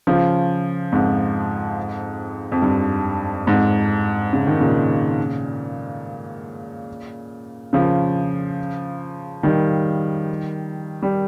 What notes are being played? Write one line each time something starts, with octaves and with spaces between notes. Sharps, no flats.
C#3 F3
F2 G#2
F2
G2
F2 G#2
C#3
D#3
A#2 C#3
C#3 F3
D#3 G3
G3